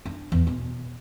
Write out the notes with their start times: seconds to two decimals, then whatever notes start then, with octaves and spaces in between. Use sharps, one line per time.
0.05 D4
0.32 E2
0.47 B2